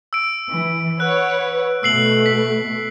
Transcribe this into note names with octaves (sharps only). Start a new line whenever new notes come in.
E6 D7
E3
B4 C#5 F#5 F#6
B2 A3 E6 C7 F#7
B6